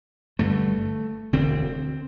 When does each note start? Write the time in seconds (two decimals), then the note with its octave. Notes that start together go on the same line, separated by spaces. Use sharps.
0.39 G1 G2 D3 A3
1.33 E1 D2 D3 C4